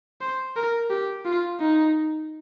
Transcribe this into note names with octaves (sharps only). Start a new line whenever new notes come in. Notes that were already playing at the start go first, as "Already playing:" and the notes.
C5
A#4
G4
F4
D#4